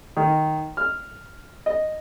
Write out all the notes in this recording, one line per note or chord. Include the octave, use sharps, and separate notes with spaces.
D#3
F6
D#5